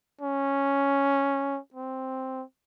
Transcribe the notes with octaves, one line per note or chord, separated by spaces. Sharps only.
C#4
C4